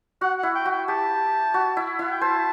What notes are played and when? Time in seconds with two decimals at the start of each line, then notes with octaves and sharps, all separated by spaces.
0.21 F#4 F#5
0.38 E4 F#5
0.55 G5
0.65 F#4
0.71 G5
0.88 G4 A5
1.54 F#4
1.77 E4
1.99 E4 F#5
2.11 G5
2.21 C5 A5